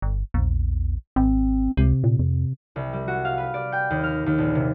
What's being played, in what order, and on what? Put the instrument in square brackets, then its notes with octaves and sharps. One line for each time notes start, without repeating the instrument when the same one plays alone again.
[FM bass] G1
[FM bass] A#1 [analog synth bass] E2
[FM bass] G#1 [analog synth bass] C4
[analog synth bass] C#2 [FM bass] C3
[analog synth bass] A#2
F2
[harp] C2
G3
F#4
F5
B4
D5
G5
D#2
F6
D#2
A#1
C3